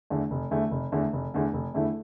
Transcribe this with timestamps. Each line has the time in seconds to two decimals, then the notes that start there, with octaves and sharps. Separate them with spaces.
0.10 E2 D3 A3
0.31 F1
0.51 E2 D3 A3
0.71 F1
0.92 E2 D3 A3
1.13 F1
1.34 E2 D3 A3
1.53 F1
1.74 E2 D3 A3 E4